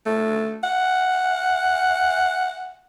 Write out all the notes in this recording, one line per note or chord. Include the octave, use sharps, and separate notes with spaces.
A3
F#5